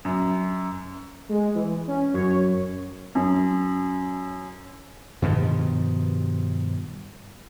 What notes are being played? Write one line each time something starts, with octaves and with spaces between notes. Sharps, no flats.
F#2
G#3
E3
C#4
F#2 C#5
F#2
G2 B2 D#3 F3